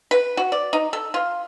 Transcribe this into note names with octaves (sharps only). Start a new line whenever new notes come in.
B4
F#4
D5
D#4
A4
F4